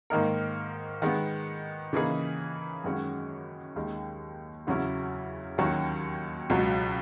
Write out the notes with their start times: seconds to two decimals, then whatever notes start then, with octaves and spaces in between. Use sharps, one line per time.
0.10 G#2 D#3 A#3 D#4 A#4
1.02 D#3 G#3 B3
1.93 C#3 E3 A#3 D#4 G#4
2.84 F#2 D#3 G#3 C#4 F#4
3.76 D#2 D#3 G#3
4.67 E2 C#3 F#3 C#4 E4
5.58 D#2 D#3 F#3 C#4 F#4
6.50 C#2 B2 F#3